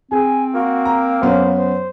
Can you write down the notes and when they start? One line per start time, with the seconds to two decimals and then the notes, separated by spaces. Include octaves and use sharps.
0.12 C4 G#4 G#5
0.54 A#3 F#4
0.85 A#5
1.22 F#2 B3 C#4 C5
1.58 C5